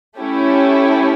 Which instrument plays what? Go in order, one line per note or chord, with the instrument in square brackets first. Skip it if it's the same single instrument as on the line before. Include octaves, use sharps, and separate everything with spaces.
[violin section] A3 C#4 E4 G4